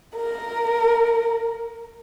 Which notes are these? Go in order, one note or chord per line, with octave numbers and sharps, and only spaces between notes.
A#4